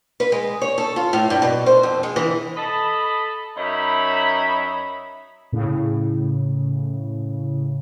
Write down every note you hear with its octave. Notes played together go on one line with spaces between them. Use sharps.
B4
G#3
C#5
A4
F4
A2
G2
B2
C5
F2
G#3
E3
A4 D#5 A5 B5
F#2 D#4 A#4 C#5 E5 B5
A2 C#3